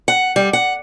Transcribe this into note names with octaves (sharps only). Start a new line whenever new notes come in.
F#5
G3
F#5